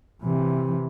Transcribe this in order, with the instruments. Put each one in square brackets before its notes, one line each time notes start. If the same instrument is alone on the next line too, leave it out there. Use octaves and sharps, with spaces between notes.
[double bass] C3 E3